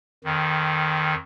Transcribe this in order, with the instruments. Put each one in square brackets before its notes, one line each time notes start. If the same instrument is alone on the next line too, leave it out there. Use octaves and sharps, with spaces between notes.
[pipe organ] F2 D#3